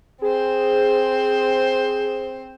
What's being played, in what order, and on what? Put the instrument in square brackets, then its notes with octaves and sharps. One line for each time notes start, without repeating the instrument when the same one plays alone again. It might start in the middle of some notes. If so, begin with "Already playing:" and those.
[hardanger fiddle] C4 C5 [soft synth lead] G#4